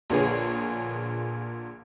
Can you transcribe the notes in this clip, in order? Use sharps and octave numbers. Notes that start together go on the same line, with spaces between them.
A#1 A#2 D3 B3 G#4 C#5